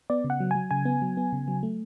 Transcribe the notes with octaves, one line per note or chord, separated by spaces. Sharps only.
B3 D5
C#3
F#5
F#3
F#3 G#5
C#3 G#5
B3
F#3
B3
C#3
F#3
A3